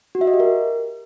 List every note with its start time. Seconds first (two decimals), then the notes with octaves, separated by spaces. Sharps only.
0.15 F#4
0.21 E5
0.27 D#5
0.34 G4
0.40 A#4